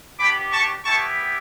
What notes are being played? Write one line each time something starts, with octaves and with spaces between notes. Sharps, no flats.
B3 D4 G4 B5 D6
A5 C#6
B3 E4 G4 A5 C#6